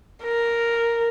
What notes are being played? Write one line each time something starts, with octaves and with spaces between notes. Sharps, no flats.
A#4